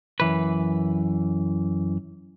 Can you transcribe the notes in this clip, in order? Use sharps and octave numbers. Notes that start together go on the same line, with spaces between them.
F#2 E3 B4